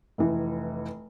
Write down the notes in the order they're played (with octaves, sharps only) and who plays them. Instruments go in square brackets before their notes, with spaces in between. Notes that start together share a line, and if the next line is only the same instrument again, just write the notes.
[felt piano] F1 E3